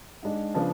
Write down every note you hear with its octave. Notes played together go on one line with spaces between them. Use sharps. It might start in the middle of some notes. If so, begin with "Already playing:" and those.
G#2 G#3 D4
C#3 F3 B3 D4